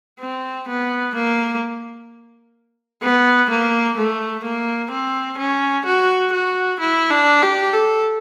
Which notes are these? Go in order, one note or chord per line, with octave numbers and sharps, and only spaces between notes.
C4
B3
A#3
B3
A#3
A3
A#3
C4
C#4
F#4
F#4
E4
D4
G4
A4